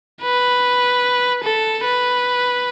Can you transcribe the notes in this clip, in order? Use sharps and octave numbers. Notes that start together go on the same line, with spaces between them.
B4
A4
B4